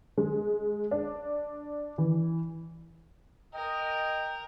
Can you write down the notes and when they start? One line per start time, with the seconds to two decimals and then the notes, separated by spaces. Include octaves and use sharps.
0.18 G#3
0.91 D4
1.98 E3
3.54 A#4 D#5 G5